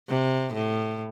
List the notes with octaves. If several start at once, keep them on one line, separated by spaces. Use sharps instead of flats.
C3
A2